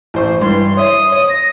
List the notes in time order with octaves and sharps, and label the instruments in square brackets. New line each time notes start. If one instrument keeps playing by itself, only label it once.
[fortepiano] A1 C5 C#6
[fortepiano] G2 E3 [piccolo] C6
[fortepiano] C#5 E5 [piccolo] D#6
[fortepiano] C#5
[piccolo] A#6